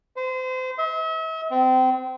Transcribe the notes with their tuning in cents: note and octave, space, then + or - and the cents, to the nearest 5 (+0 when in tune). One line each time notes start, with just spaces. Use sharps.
C5 -30
E5 -45
C4 -30